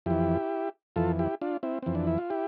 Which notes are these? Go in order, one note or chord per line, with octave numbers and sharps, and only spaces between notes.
F2 E3 E4 G4
F2 E3 F4 A4
E4 G4
D4 F4
C4 E4
F2 E3 C4
D4
E4
F4
E4 G4